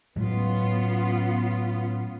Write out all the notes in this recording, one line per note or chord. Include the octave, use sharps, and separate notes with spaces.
A2 F#3 G#3 B3 C#4 F4